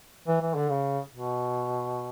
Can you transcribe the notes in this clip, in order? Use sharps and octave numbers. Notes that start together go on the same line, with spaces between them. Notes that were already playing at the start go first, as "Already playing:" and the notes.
E3
E3
D3
C#3
B2